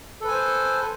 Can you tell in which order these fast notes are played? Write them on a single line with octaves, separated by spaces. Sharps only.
A4 B4 G#5 C5